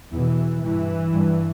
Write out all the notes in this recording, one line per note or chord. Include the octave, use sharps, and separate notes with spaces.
E2 B2 E3
G2 E3
G2